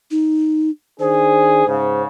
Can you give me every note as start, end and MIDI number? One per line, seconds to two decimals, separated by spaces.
0.11 0.70 63
1.00 1.67 51
1.00 1.67 62
1.00 1.67 68
1.00 2.02 72
1.67 2.05 44
1.67 2.05 49